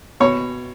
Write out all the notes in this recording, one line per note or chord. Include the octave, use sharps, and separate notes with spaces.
B2 C#5